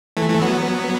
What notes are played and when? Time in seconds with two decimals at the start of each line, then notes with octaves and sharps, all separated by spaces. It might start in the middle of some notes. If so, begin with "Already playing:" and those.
0.17 E3 A3
0.29 E3 A3
0.42 F#3 B3